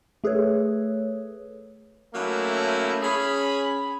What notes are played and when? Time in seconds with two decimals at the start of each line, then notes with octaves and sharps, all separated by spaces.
0.24 A3 G#4 A4 B4 C#5
2.14 F#3 A3 A#3 C#4 D#4 E4
3.03 C#4 G#4 B5